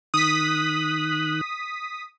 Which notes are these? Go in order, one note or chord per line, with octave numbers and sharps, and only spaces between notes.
D#3 D#6 F#6 B6